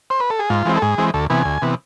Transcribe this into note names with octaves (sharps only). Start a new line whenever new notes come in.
C5
B4
A4
G#4
G#2 F4
E3 G#3 C4
A4
G#2 G#4
E3 G#3 C4
D2 A4
C3 E3 B3 G#5
D2
C3 E3 B3